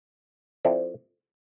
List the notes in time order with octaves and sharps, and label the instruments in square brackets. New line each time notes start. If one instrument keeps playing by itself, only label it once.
[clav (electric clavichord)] F3 C4 E4 A4 D5